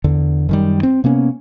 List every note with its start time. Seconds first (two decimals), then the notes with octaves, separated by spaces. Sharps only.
0.04 E2 D3
0.49 F#2 D#3 G3
0.83 C4
1.04 C3 A#3 B3 C#4